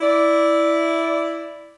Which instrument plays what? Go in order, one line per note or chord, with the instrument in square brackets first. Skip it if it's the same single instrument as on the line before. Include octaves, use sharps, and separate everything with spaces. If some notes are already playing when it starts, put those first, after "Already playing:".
[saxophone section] E4 D5